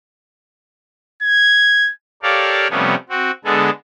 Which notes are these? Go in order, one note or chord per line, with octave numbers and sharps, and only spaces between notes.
G#6
G4 A4 A#4 C#5 D5 F5
C3 F3 G3 A3 B3 C#4
C4 F#4
D3 G#3 B3 G#4 A4